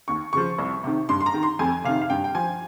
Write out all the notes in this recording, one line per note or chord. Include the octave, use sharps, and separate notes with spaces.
D#2 C#6
C#3 F3 C#6
C2
C3 D#3
G2 C6
C6
A#5
D#3
C6
F2 G#5
C3 D#3 F5
F5
G2 G5
G5
F3 G#5